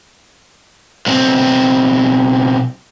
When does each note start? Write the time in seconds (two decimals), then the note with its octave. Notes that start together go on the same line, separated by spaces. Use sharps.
1.06 B1 C4